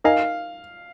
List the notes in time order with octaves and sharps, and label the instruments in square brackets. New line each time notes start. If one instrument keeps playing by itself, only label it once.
[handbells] D#4 A#4 D#5 G#5 [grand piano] F5